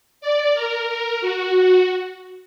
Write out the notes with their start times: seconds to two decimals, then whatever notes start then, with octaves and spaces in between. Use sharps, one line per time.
0.21 D5
0.54 A#4
0.88 A#4
1.21 F#4
1.56 F#4